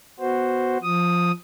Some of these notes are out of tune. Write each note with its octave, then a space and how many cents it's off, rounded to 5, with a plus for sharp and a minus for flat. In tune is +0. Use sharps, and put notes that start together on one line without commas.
B3 +0 F#4 +0 C5 +0
F3 +0 D#6 +0